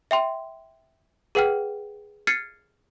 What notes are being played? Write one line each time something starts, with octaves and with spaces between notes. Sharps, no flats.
E5 G5 C6
G#4 B4 F#5 G5 F6
F6 G#6 A6 C7 C#7 D#7